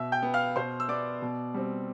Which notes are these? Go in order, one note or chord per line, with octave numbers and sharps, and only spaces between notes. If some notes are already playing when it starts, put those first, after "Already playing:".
Already playing: B2 E5 E6
G5 G6
B3
F5 F6
B2 C5 C6
E6
B3 D5 D6
B2
G3 C4